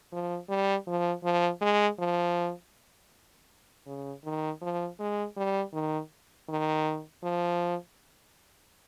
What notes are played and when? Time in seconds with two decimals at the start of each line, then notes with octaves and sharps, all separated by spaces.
0.12 F3
0.49 G3
0.87 F3
1.24 F3
1.61 G#3
1.99 F3
3.86 C#3
4.24 D#3
4.61 F3
4.99 G#3
5.37 G3
5.73 D#3
6.49 D#3
7.23 F3